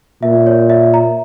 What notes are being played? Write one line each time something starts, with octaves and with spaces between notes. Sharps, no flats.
A#2 E5
C#5
E5
A#5